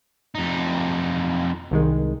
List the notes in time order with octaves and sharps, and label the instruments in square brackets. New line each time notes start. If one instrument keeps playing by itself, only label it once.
[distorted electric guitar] F2 D#4
[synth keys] C2 D#3 G#3